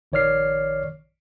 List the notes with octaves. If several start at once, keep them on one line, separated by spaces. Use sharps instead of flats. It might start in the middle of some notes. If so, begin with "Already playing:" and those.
A#1 D#3 C#5 D5 F6 C7